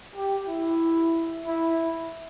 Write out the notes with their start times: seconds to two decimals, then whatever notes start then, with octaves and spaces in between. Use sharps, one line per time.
0.16 G4
0.48 E4
1.46 E4